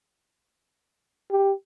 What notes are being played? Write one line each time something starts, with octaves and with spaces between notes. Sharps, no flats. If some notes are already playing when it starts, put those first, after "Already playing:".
G4